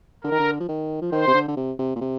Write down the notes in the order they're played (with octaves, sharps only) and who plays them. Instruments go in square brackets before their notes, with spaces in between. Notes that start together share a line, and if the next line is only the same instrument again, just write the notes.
[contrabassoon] D3 [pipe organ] A#4
[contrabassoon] D#3
D3
F3
D#3
F3
[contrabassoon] D#3 [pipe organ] C5
[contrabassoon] C3
D3
D3
C3
C3
A#2
C3